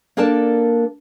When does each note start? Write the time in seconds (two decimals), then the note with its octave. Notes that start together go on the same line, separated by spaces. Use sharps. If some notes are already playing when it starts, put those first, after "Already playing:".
0.17 A#3 D4 A4 A#4 D5 A5